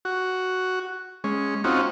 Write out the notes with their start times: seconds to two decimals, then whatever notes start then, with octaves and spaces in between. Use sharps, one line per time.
0.05 F#4
1.24 G#3 C#4
1.64 C4 C#4 D#4 F4 F#4